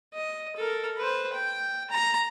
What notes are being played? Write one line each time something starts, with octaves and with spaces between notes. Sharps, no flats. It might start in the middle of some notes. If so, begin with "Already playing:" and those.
D#5
A4 A#4
B4 C5
G5
A#5